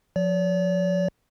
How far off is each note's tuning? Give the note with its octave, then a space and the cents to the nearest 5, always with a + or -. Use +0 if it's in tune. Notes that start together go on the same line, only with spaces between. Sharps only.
F3 +30 D5 -45